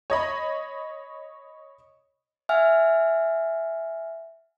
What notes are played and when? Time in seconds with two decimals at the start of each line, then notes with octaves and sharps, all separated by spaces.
0.10 C#5 D#5 B5
2.49 E5 F#5 G#5 F6